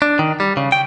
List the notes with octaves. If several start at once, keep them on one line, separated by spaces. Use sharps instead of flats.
D4
D#3
G3
C#3
G5